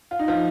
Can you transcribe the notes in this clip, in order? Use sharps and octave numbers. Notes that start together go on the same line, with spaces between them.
F4
D#4
F3 F4